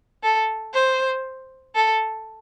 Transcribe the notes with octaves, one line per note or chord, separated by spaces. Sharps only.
A4
C5
A4